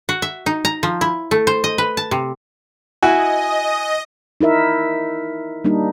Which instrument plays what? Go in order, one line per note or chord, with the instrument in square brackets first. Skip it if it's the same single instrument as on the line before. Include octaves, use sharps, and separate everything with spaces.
[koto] F#4
E5
D#4
A#5
F3
E4
A3
C5
D#5
B4
A5
C3
[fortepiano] E4 F#4 [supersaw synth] D#5 [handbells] G#5
[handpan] D#4 E4 A#4 E5
G3 A#3 D4 D#4